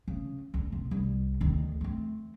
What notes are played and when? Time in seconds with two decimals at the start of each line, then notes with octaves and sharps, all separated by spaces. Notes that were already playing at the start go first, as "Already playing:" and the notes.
0.08 C#3
0.54 D2
0.72 C3
0.91 C2
1.41 D2 D#3
1.81 A3 C4